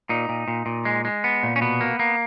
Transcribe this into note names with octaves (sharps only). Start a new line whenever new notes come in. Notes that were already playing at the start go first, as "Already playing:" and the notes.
A#2 D#4
A#2
A#2
A#2
G#3
G#3
B3
A#2
C#4
B2 B3
A#3
A#3